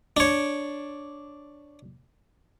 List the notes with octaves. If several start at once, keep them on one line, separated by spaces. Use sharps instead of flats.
D4 C#5